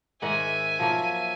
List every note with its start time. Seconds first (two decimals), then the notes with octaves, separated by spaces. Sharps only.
0.22 G#2 D#3 E5 F#5 G#5
0.79 F3 F#3 A#3